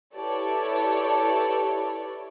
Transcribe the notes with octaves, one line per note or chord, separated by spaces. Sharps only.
E4 G4 A4 B4 C#5 D5